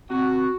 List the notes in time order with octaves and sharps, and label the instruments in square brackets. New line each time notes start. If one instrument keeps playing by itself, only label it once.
[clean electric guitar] C3 [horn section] F#4